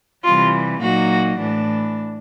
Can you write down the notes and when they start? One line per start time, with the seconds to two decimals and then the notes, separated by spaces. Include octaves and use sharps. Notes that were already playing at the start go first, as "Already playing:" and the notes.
0.25 C3 E3 G3 F4
0.81 A#2 F#3 A#3 D#4 F#4
1.38 A2 E3 A3 D4